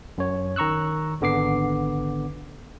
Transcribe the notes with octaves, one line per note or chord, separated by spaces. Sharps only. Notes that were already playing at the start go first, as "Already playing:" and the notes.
F#2 C#5
D#3 A#5 C#6 E6 F#6
G#1 D3 B3 D6 C7